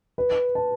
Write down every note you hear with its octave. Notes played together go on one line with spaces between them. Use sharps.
B4
A5